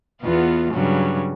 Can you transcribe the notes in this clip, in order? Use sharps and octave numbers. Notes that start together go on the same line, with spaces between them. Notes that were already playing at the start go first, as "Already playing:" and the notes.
E2 B3 F4
G2 C#3 F#3